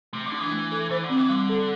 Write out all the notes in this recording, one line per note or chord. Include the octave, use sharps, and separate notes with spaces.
C3 A3
D3
D4
E3
A3
A4
E3 C5
D3
C4
E3
D3 G3
A4